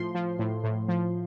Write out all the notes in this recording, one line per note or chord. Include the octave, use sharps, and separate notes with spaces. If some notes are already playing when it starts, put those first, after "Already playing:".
Already playing: A2 F3 C6
F3
A2
A2
F3